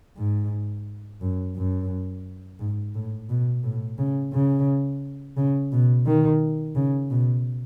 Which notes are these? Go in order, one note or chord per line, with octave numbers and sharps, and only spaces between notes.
G#2
F#2
F#2
G#2
A2
B2
A2
C#3
C#3
C#3
B2
D#3
C#3
B2